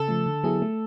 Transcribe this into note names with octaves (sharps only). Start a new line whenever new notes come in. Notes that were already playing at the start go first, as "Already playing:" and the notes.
Already playing: C#3 A4
F3 A3
D3
F#3 B3 E4 G#4
A3